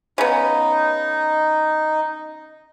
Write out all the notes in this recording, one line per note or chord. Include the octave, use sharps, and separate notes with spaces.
C#3 B3 D#4